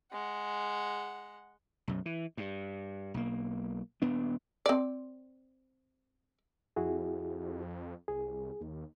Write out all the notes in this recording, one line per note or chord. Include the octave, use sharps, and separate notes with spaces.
G#3 F#5
B1 F#2
E3
G2
B1 A#3
D#1 B3 D4
C4 D5
F2 E4 F#4 G#4
C2 G#4
D#2